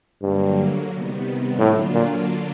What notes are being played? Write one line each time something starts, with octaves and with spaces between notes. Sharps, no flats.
G2 D3 F#3 A#3
C3 D#3 G3 B3
A2 D3 F#3 A#3 D4 F4
A#2